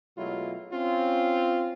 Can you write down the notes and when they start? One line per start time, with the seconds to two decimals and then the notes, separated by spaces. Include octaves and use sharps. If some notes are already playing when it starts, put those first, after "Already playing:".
0.17 B2 F#3 G#3 A3 E4 F4
0.72 C4 C#4 F4